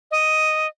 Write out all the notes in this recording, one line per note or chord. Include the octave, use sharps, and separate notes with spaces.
D#5